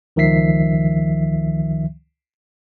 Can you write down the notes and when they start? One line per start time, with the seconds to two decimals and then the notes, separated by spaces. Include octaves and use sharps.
0.16 C#2 D#3 F3 E5 B6 C7